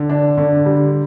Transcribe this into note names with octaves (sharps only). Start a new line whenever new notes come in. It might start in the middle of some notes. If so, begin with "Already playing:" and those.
Already playing: D3
D4
D3
G3